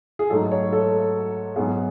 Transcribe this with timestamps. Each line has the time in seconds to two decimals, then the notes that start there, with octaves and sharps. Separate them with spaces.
0.19 G#4
0.30 G#2 F#3 A3 D#4 A4
0.52 C#5
0.72 A4
1.56 G#2 F#3 B3 G#4